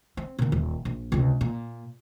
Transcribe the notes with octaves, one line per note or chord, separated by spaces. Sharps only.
C4
A#2 D3
D#1
A#1
C#2 C3
A#2